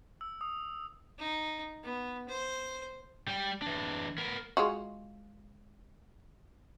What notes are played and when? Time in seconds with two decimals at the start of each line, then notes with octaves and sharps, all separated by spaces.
0.21 E6
0.41 D#6
1.19 D#4
1.84 B3
2.29 C5
3.27 G3 G5
3.62 E3 D4
4.18 B3 A#4
4.57 G#3 F4 F#4